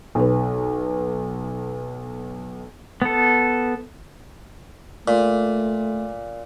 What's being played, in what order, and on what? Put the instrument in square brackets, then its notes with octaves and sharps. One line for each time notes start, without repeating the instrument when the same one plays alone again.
[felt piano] B1 B4
[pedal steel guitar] B3 A4
[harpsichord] A#2 [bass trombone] A3